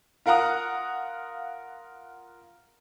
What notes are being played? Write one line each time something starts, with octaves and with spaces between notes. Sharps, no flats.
F4 A#4 F5 F#5 A#5 D#6